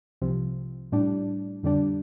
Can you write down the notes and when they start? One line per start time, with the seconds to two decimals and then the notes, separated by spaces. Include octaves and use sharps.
0.22 C2 C3 F3
0.92 A2 G3 D4
1.63 F2 D3 G3 D4